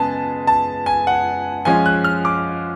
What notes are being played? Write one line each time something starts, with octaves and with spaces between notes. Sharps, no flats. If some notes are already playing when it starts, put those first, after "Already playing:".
Already playing: C#3 G#3 B3 G#5 A5
A5
G#5
F#5
F3 G#3 C#4 G#5
F#6
F6
D6